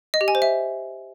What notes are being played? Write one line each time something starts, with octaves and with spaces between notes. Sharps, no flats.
D#5
G4
G#5
C5
E5